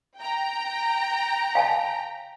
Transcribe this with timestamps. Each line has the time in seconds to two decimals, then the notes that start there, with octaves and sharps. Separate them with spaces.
0.17 G5 A#5
1.55 F5 G#5 A5